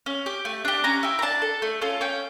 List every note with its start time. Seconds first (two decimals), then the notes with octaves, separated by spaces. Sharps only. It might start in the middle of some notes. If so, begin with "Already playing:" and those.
0.06 C#4
0.26 G4
0.45 A3
0.65 D4 G4
0.84 C#4 A#5
1.03 E4 G4
1.19 A#5
1.22 D4 A5
1.42 A4
1.62 A3
1.82 C#4 F4 A4
2.01 C#4 G5